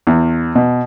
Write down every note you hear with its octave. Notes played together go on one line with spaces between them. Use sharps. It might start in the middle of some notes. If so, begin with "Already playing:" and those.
E2
B2